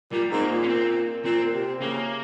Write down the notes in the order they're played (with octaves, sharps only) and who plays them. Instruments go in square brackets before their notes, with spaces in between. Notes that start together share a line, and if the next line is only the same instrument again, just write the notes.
[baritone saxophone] A#2 [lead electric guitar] G3
[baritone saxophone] G#2 [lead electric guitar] C4
[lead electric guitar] A#3
[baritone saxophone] A#2
[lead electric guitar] C#4
C4
[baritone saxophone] A#2 [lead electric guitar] C4
[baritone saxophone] C3
[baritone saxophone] C#3 [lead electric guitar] A#3